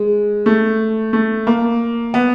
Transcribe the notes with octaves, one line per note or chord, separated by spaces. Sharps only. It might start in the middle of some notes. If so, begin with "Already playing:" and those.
Already playing: G#3
A3
A3
A#3
B3